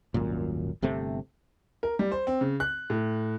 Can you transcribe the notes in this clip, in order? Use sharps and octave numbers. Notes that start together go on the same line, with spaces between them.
D#1 G#1 F#2 A#2
G1 C3 A3 C4
A#4
G3
C5
C4
C#3
F#6
A2